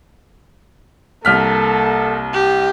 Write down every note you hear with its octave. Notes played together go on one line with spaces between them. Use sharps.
C2 A#3 A4 F6 B6
G4